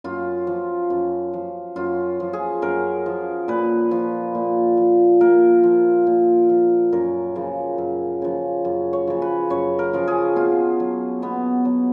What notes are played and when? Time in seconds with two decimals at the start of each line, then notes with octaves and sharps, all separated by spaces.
0.04 F#2 F4
0.47 F3
0.90 F#2
1.33 F3
1.76 F#2 F4
2.20 F3
2.33 G#4
2.62 F#2 A#4
3.06 F3
3.48 A#2 B4
3.91 F3
4.35 A#2
4.77 F3
5.21 A#2 A#4
5.63 F3
6.07 A#2
6.49 F3
6.92 F#2 A#4
7.35 C#3 F3
7.78 F#2
8.22 C#3 F3
8.65 F#2
8.93 C#5
9.07 C#3 F3
9.22 B4
9.50 F#2 C#5
9.79 A#4
9.93 C#3 F3
10.08 G#4
10.36 B2 F4
10.80 F#3
11.22 B2 B3
11.65 F#3